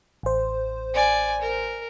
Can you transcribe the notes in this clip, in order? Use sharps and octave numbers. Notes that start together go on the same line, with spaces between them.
A1 C5
D5 G#5
A#4